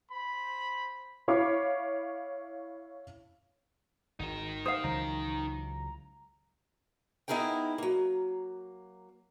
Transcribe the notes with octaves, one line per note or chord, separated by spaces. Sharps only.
C5 B5
E4 C#5 F5 B5 D6
G#1 D#4 A#4
C5 F5 D#6
C#2 E3 F#3 A#5
B3 D#4 E4 G#4 A#4 G5
F#3 A#3